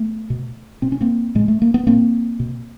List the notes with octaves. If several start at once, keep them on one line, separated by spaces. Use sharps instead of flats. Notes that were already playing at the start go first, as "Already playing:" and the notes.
Already playing: A3 B3
B2
B2 C4
C#4
A#3 C4
A2 G#3
A3
A#3
B3
A#2 A#3 C4
B2